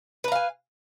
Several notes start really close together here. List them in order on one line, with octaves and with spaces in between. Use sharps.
B4 A#5 F5 G#5